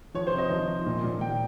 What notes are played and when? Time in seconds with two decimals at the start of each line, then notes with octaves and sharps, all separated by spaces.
0.14 F3 C#5
0.27 C5
0.33 C3
0.38 D#5
0.50 F3
0.67 F3
0.86 A#2
1.04 A#2
1.21 F3 G5